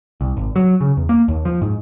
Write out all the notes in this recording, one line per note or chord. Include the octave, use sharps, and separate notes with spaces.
C2
G#1
F#3
C#3
E2
A#3
D#2
F3
G#2